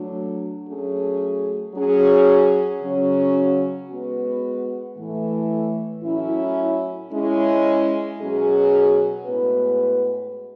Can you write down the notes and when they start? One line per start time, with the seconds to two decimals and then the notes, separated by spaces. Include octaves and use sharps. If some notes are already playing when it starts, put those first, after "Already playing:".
Already playing: F#3 A3 D4
0.65 F#3 A3 C#4 G#4
1.73 F#3 C#4 G#4
2.80 C#3 F#3 C#4
3.88 G#3 B3 F#4 B4
4.95 A2 E3 A3
6.03 A2 F#3 C#4 E4
7.10 G#3 C#4 E4
8.18 B2 F#3 C#4 G#4
9.25 A2 G#3 B3 F#4 B4